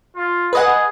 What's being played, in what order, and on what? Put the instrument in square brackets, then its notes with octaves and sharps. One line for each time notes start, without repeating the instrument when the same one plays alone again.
[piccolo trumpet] F4
[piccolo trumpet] G#4 [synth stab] B4 D#5 F#5